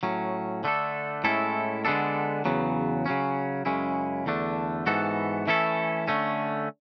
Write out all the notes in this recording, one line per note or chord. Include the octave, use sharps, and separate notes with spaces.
A2 F#3 C#4
D3 A3 D4 A4
A2 G#3 C#4 E4 A4
D3 G#3 B3 D4 A4
E2 C#3 F#3 B3
C#3 F#3 C#4
F#2 C#3 G#3 C#4 E4
E2 D3 A3 D4
G#2 E3 B3 F#4 A4
E3 A3 C#4 E4 A4
D3 A3 C#4